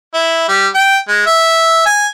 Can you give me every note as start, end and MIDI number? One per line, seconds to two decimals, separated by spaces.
0.14 0.44 64
0.49 0.68 55
0.75 0.97 79
1.09 1.25 56
1.27 1.82 76
1.86 2.08 80